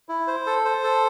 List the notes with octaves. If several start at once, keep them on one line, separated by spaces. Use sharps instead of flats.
E4
C5
A4
C5
A4